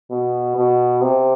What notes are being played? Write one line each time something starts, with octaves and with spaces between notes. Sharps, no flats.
B2
B2
C3